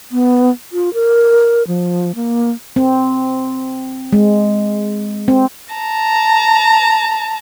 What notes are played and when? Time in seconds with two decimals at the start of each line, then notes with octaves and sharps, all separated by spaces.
0.12 B3
0.72 F4
0.94 A#4
1.68 F3
2.15 A#3
2.76 C4
4.13 G#3
5.28 C4
5.74 A5 A#5